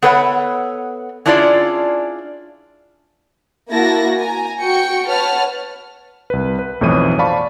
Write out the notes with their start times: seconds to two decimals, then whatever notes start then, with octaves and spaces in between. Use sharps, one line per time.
0.02 B3 A4 B4 C#5 E5 F#5
1.26 C#4 D4 E4 F4 G#4 D5
3.71 A#3 E4 F#4 A5 A#6
4.17 G#5 A#5
4.61 F#4 G5 C#6 C#7
5.08 B4 C#5 F#5 A5 F6
6.30 C2 B4
6.59 B4
6.81 B1 F2 A2 E3 C#5 D#7
7.18 C5 D5 F5 A5 B5 C#6